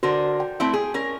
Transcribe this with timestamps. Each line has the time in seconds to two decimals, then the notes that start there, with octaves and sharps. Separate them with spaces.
0.03 D3 F#4 A#4 C5 D5
0.40 G5
0.60 A3 C4 E4
0.73 G#4
0.94 C#4 A#4